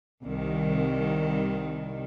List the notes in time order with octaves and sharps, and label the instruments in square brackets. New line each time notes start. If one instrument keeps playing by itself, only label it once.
[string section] C2 D#3